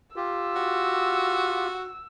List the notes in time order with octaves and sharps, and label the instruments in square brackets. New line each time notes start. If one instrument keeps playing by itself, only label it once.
[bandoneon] F4 G4 [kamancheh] E6
[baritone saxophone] F#4